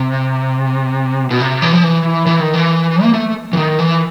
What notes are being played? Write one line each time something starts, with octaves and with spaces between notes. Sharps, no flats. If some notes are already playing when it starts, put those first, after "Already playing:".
Already playing: C3
B2
C3
E3
F3
E3
E3
D#3
E3
A#3
A3
E3
D#3
E3